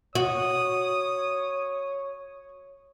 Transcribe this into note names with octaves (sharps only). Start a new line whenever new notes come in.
F#4 C#5 D#6